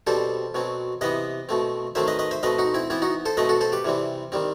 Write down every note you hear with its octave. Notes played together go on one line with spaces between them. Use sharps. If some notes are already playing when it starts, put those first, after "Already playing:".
B2 G3 C4 A4 C5
B2 F#3 C4
C3 E3 B3 B4 D#5
B2 A3 C4
D#3 F#3 A3 C4 C5 E5
B4 D#5
B4 D#5
C5 E5
B2 A3 C4 B4 D#5
D#4 F#4
C4 E4
E3 B3 C4 E4
D#4 F#4
A4 C5
B2 A3 C4 B4 D#5
F#4 A4
A4 C5
G4 B4
C3 E3 G3 C4
D#3 G3 C4